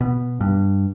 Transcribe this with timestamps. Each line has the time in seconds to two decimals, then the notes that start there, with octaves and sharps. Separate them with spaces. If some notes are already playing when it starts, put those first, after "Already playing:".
0.01 B2
0.41 G2